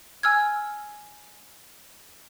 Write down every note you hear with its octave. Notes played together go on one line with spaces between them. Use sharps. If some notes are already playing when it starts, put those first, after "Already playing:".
G#5 E6 F6 G#6